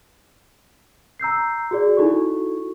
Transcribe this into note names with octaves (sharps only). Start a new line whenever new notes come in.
A#5 E6 G6 C7
F#4 G#4 D5
D#4 E4 F#4 A4 C#6